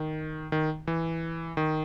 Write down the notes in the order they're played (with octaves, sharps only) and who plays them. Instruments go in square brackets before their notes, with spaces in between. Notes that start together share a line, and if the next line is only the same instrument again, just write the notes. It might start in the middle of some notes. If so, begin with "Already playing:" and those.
Already playing: [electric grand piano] D#3
D#3
E3
D#3